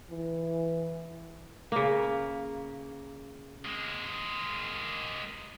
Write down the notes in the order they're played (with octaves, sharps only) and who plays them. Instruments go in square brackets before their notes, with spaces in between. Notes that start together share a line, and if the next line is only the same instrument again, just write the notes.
[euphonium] E3
[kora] C#3 A#3
[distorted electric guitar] G#3 A#3